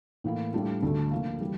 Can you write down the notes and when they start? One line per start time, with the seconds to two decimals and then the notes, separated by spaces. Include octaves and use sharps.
0.24 A2 E3 A#3 E4
0.54 A2 G3 D4 F4
0.82 D2 D3 A3
1.11 D3 F3 A#3
1.41 E3 G3